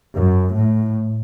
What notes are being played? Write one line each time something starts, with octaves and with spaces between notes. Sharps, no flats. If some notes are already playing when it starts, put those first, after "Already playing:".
F#2
A2